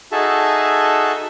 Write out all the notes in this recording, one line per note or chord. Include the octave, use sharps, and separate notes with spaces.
D#4 F#4 G#4 A4 E5 A5